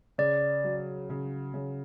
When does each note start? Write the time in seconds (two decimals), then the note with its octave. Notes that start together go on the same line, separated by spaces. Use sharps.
0.18 C#3 D5
0.64 F#3
1.10 C#3
1.54 C#3